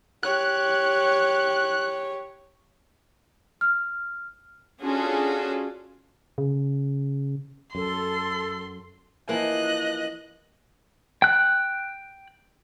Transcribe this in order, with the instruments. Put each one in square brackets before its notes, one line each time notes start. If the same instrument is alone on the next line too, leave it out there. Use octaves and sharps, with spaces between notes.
[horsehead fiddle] G4 C#5 [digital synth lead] F#6
[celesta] F6
[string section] C#4 D4 F4 F#4 G#4 A4
[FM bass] C#3
[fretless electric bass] F#2 [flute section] A4 [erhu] C6
[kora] E3 F3 A#3 [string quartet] D#5 F#6
[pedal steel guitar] G5 F#6